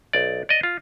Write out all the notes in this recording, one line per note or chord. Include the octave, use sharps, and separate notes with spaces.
B1 D5
D5 D#5
F4